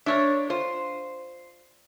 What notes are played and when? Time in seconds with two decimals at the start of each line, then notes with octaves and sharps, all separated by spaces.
0.06 D4 A#4 C#5 E5
0.50 F4 C5